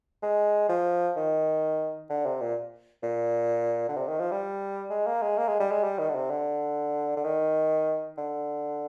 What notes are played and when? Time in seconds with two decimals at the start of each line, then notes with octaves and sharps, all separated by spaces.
0.22 G#3
0.69 F3
1.17 D#3
2.10 D3
2.26 C3
2.41 A#2
3.03 A#2
3.89 D3
3.97 C3
4.08 D#3
4.20 F3
4.31 G3
4.90 G#3
5.06 A#3
5.22 G#3
5.38 A#3
5.48 G#3
5.60 G3
5.71 G#3
5.84 G3
5.99 D#3
6.09 D3
6.15 C3
6.30 D3
7.17 D3
7.24 D#3
8.18 D3